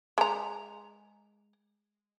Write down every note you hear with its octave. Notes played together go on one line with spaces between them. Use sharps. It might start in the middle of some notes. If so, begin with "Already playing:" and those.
G#3 A#5